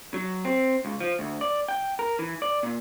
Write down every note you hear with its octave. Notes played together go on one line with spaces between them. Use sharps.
F#3
C4
C#2
F3
D2
D5
G5
A#4
E3
D5
A#2